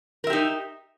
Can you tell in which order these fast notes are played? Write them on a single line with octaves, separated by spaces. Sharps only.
A#4 E5 G4 D#4